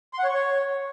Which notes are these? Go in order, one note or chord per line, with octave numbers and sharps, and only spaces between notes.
C6
F#5
C#5
C#6
C#5